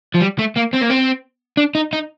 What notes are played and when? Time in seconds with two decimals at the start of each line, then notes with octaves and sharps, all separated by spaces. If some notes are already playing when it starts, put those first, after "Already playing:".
0.15 F3
0.21 G3
0.39 A3
0.56 A#3
0.73 C4
0.81 A#3
0.90 C4
1.57 D4
1.75 D#4
1.93 D#4